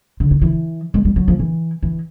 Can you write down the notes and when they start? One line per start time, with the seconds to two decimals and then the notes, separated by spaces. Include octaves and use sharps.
0.20 D3
0.31 D#3
0.42 E3
0.94 G#3
1.05 G3
1.16 F#3
1.28 F3
1.39 E3
1.83 E3